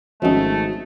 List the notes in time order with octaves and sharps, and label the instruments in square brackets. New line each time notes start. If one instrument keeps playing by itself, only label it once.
[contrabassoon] G#1 [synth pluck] F3 C#4 [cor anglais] A3 [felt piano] F#4 D#5